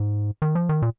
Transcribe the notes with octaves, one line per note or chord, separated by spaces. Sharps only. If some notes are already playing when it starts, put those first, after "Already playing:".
Already playing: G#2
D#3
F3
D#3
A#2